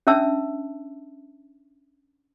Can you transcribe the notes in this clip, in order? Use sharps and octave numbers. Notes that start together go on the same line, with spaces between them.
C#4 D4 E5 A5 E6